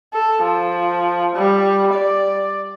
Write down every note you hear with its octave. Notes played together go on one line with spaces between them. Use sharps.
A4
F3
G3
D5